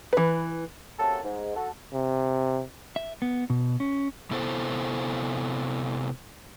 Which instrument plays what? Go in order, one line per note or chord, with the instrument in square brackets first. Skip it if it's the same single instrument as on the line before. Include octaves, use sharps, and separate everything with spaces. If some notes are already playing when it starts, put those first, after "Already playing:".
[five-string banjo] E3 B4
[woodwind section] C3 F#3 A#3 C#4 F#4 A4
G#2
F#4 A4
[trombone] C3
[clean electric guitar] E5
B3
B2
C#4
[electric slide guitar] C3 B3 E4 A4 C5